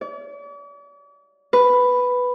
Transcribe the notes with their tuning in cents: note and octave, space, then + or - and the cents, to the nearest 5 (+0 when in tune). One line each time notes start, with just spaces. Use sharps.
D5 -45
B4 +5